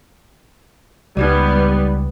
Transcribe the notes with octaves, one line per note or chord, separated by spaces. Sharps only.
C#2 G3 B3 D#4 G4 D5